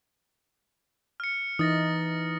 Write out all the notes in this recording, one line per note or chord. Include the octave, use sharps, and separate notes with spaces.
F6 C#7
E3 D#4 D#6 A6 A#6